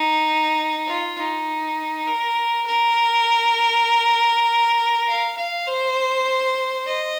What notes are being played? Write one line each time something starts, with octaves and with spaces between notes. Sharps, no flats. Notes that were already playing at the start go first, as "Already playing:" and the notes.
Already playing: D#4
F4
D#4
A#4
A#4
F5
F5
C5
D#5